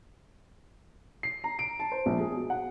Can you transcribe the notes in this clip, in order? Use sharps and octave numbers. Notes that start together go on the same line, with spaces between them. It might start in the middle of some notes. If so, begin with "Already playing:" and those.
C7
A#5
D7
A5
C5
A#1
G#4
B2
F#5